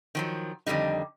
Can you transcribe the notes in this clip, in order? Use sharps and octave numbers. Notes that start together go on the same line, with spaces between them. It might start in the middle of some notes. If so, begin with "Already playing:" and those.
D#3 F3 F#3
F2 D3 D#3 G3 D#4